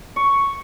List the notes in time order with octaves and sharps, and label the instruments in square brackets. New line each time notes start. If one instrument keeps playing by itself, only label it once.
[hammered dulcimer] C#6